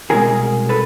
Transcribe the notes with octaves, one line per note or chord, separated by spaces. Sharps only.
C2 B2 G#3 G#4 A#4
A4 B4